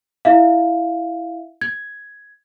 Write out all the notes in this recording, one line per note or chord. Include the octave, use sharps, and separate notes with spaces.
E4 E5 F5
G#6